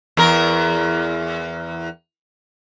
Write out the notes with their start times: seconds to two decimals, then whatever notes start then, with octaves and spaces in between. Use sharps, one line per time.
0.17 E2 A#4